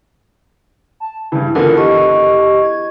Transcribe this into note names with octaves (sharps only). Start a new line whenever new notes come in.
A5
G2 C#3 E3
D3 E3 B3 F4 A#4 A5
G4 D#5 C#6
G#6